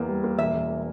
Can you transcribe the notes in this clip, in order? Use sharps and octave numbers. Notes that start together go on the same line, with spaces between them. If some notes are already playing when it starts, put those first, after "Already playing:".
Already playing: E2 A#3
G3
A#3
E1 E5
E1